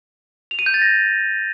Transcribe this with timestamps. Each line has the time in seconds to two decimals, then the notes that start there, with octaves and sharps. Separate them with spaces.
0.51 F7
0.59 D#7
0.66 G6
0.74 A6
0.82 A#6